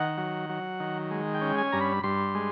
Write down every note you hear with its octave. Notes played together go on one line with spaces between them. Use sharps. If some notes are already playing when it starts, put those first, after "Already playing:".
Already playing: D#3 F#5
F#3
F#3
D#3
G#3
G5
C#4
G#5
G2 A#5
B5
G2 C6
G#3